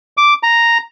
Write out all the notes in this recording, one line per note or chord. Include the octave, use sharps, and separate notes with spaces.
D6
A#5